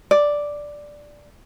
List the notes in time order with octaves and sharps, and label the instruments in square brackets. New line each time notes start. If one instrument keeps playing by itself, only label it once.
[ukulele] D5